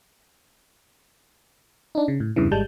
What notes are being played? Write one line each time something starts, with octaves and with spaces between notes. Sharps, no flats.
D4 D#4
C#3
A2
E2 G2 C#3 E3
G#1 G3 G#3 A5 G6